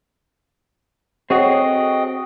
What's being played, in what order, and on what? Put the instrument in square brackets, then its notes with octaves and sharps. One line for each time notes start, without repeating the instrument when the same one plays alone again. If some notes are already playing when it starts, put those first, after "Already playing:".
[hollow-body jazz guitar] C4 [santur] F#4 [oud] G#4 A4 C#5 [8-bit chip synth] D#5 G5 D#6